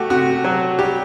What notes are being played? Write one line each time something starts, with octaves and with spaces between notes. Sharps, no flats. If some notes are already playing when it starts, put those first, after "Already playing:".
Already playing: A3 F#4 G4
C3 F#4
F#3 F#4
G3 G4